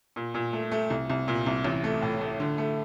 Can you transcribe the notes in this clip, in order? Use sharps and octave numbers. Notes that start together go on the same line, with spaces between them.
A#2
A#2
A3
A3
C2
C2
A#2
C2
A1
A3
A2
A3
D3
A3